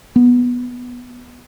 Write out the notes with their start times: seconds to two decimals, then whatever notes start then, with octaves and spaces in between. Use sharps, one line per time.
0.16 B3